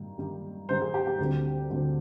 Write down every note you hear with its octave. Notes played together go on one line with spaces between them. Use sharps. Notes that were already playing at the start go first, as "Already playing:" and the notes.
Already playing: G2 D#3 G3
G2 D#3 G3
G2 D#3 G3 C5
G#4
G4
G4
D2 D3 G3 C4
D2 D3 G3 C4